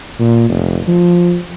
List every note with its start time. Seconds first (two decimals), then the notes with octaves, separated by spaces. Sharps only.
0.19 A#2
0.49 F1
0.88 F3